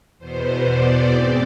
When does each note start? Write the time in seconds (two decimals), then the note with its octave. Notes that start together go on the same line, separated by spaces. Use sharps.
0.18 E2 B2 B3 C5
0.64 D5
1.10 G#2 G#3 C4